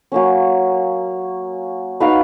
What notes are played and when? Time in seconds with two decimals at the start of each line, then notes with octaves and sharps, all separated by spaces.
0.12 F#3 A#3 C#4
2.00 D#4 F#4 B4 F5